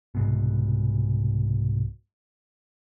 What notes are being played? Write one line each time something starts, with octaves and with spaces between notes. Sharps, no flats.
C2 G#2 B2